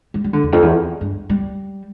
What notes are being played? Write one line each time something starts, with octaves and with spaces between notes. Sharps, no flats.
G3
G3
D3
E2
F2
E2
G2
G3